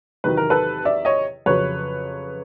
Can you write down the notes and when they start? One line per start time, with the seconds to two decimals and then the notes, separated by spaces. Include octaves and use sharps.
0.24 E2 C3 D#3 F#3 B4
0.37 A#4
0.50 A4 B4
0.85 D5 E5
1.05 C#5 D#5
1.46 F2 C#3 F#3 B4 C#5